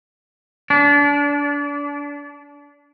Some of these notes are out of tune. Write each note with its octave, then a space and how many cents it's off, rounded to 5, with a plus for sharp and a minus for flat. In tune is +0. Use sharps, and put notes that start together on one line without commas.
D4 -30